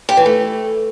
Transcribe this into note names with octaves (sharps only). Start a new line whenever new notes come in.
G4
E3
A3